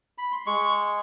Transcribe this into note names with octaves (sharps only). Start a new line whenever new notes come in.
B5
C6
G#3 C#6